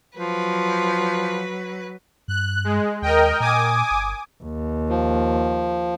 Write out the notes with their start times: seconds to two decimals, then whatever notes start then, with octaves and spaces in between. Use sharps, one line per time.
0.17 F3 F#3 B4
2.28 G2 F#6
2.64 G#3
3.02 D#2 A#4 D#5 G5
3.40 A#2 G#5 D6 D#6
3.91 G1
4.44 D#2
4.89 F3